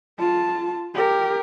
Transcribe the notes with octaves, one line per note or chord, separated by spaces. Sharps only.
F4 A5
G4 A#4